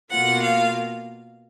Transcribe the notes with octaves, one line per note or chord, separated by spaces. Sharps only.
B2 A#3 F4 F#5
F5